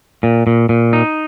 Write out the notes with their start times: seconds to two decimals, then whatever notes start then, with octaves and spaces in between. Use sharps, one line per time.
0.23 A#2
0.47 A#2
0.69 A#2
0.93 D#4